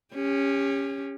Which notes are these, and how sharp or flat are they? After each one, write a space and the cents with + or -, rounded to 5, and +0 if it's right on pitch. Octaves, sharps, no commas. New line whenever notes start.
C#4 +0 G4 +35